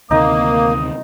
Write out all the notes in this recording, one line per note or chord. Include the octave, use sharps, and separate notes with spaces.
D2 C3 D#3 A#3 D#4 D#6